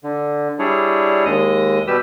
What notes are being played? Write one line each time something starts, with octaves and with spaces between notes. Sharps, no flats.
D3
G3 D4 E4 G#4 C#5
D#2 G#3 D#5 D#6
B2 G3 G4 B4 E6